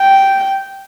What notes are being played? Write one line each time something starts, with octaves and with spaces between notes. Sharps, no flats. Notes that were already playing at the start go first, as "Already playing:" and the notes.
Already playing: G5